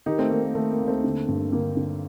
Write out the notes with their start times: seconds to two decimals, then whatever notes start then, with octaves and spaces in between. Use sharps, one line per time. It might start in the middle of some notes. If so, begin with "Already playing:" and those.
0.06 D#3 D#4 G4
0.18 A3 C4
0.31 D#3 A#3
0.43 A#3
0.55 D#3 A3
0.71 A#3
0.80 D#2
0.87 A3 C4
1.04 D3
1.28 G2
1.52 D3 A#3
1.77 D3